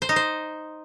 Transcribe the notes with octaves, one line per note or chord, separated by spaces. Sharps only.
C5
D#4
C5